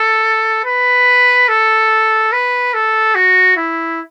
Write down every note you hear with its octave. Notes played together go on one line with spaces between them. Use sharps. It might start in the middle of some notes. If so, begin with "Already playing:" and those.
Already playing: A4
B4
A4
B4
A4
F#4
E4